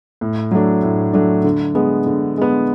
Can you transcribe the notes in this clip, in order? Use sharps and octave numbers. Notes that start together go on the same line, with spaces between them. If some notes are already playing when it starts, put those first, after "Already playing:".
A2
F#3 A3 D4
A2
F#3 A3 D4
D3
G#3 B3
D3
G#3 B3